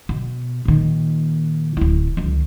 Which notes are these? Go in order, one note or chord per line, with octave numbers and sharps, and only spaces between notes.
B2
A#2 D#3
D1 E4
C#2 D#3